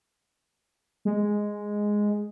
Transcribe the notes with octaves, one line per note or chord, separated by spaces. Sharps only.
G#3